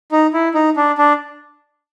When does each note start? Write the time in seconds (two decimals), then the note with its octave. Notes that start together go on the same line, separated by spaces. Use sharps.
0.12 D#4
0.34 E4
0.54 D#4
0.77 D4
0.98 D4